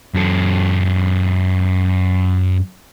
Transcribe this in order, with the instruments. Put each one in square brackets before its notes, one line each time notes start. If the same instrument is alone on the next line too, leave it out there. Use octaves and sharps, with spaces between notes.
[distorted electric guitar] F#2 A4